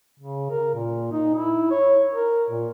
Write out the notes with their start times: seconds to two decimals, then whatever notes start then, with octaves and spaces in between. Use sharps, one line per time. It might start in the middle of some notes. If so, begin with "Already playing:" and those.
0.20 C#3
0.50 A#4
0.74 A#2
1.12 D#4
1.34 E4
1.71 C#5
2.13 A#4
2.50 A#2